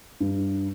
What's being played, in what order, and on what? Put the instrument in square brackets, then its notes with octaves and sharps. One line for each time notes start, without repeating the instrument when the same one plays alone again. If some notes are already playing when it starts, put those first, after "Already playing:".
[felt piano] G2